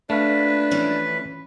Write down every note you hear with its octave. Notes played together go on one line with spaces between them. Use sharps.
A3 D4 B4 F5
E3 F3 C#4